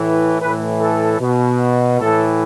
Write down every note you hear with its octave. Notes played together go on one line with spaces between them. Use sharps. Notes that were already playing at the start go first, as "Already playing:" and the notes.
Already playing: A2 E3
A2 E3 B4
A4
B2
A2 E3 A4